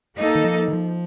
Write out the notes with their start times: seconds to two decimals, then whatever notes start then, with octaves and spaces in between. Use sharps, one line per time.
0.17 A#3 D#4 A4
0.35 D#3
0.44 F3
0.68 D#3
0.73 F3